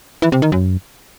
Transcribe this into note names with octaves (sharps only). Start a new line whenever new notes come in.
E3
C3
D#3
F#2